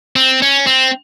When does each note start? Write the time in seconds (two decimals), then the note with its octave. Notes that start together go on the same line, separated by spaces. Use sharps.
0.16 C4
0.42 C#4
0.67 C4